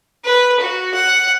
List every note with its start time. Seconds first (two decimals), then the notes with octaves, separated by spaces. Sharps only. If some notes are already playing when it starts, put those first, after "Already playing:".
0.25 B4
0.60 F#4
0.94 F#5